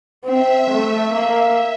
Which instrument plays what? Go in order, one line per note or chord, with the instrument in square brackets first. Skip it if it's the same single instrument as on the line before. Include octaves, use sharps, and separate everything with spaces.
[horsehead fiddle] C4 [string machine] E5
[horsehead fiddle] A3
A#3